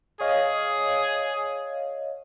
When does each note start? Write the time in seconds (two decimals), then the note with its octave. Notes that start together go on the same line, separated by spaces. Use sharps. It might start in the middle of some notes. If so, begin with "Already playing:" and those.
0.21 G#4 C#5 D#5 F5